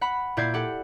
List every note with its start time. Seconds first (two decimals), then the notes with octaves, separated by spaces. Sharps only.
0.01 F#5 B5
0.37 A#2 E4 D5 G6 G#6 C7
0.54 G4 A4 F#5